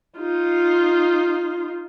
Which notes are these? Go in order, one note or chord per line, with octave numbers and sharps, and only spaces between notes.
D#4 F4